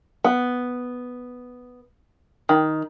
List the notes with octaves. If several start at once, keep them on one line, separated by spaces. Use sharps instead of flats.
B3
D#3